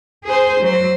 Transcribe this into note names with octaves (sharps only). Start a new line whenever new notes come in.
G#4 C5
F#3 C5